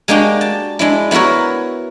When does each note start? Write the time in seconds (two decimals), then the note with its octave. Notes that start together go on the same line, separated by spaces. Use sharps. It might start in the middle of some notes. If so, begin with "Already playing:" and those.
0.08 G#3 A#3 D4 F#4 G4
0.41 A5
0.79 G#3 D4 E4
1.11 B3 E4 F#4 A#4 C#5